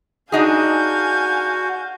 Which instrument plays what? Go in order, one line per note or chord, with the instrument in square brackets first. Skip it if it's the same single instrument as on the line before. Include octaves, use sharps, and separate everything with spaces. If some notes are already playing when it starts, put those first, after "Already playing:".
[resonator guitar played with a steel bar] D4 D#4 G#4 [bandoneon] F#4 [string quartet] F5 G#5 G6